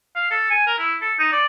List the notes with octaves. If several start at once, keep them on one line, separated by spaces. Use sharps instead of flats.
F5
A4
G#5
A#4
E4
A4
D#4
D5